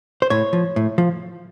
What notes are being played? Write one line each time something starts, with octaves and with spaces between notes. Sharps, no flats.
C5
A2 C#5
F3
A2
F3